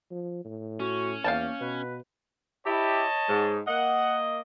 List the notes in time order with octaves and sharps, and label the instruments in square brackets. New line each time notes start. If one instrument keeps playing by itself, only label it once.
[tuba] F3
A2
[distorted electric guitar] C#4 [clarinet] F#4
[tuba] E2 [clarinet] A#3 [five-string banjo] F5 G5 A5
[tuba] B2 [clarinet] B4
[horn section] E4 G4 [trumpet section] C#5 D#5 A5
[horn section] G#2
[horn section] A#3 D#5 [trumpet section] F#5